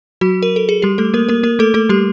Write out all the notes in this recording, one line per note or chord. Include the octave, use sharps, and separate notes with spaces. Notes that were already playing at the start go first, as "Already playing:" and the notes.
F#3 F#4
A#4
A4
G#4
G3 G4
A3 A4
A#3 A#4
A#3 A#4
A#3 A#4
A3 A4
A3 A4
G3 G4